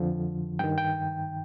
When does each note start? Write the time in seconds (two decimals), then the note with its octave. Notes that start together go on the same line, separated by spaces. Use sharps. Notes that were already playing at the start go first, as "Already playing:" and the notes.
Already playing: F2 D3 F3
0.59 G2 D#3 G5
0.78 G5